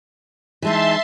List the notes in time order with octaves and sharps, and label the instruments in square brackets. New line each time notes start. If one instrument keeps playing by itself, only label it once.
[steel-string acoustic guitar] E3 G#3 D#4 [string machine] E5 A5 C6